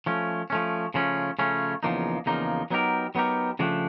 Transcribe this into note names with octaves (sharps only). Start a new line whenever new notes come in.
F3 A3 C#4
F3 A3 C#4
C#3 F3 A3 C#4
C#3 F3 A3 C#4
E2 C#3 F3 A#3 D#4
E2 C#3 F3 A#3 D#4
F#3 B3 D#4 G4 A#4
F#3 B3 D#4 G4 A#4
C#3 F3 A3 D4 G4